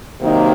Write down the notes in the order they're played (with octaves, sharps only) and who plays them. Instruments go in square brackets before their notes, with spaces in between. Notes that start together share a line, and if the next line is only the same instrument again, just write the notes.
[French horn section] C3 D#3 F#3 A#3 D#4